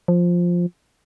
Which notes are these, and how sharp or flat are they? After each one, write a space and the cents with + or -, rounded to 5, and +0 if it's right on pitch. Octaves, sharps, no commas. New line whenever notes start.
F3 +5